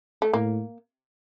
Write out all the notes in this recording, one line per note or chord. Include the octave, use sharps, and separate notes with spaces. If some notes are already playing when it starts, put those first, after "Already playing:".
A3
A2 A#3